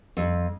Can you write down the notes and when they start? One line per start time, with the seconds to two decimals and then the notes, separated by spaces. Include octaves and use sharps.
0.17 F2